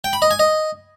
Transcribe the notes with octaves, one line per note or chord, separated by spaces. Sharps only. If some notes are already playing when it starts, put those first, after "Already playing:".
G5
B5
D#5
G#5
D#5